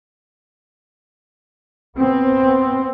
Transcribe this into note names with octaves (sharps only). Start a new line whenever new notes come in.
B3 C4